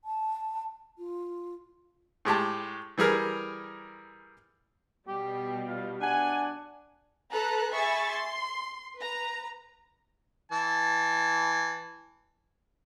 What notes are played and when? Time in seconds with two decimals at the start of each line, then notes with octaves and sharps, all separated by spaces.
0.05 A5
0.98 F4
2.25 A2 G#3 G4 A5
2.98 E3 G3 G#4 A#4
5.08 B2 G3 G4
5.67 F4
6.01 D4 F#5 G#5
7.32 A4 B4 A5 A#5 F#6
7.72 G#4 E5 G#5 B5 C#6 A6
8.12 C6
8.97 B4 A#5
10.52 E3 A5